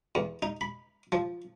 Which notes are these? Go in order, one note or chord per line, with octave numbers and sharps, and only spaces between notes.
E2
D#4
B5
F3